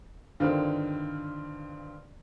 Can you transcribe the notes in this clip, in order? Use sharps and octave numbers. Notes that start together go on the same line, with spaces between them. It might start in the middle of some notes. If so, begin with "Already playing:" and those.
G2 D3 D#3 C4 F4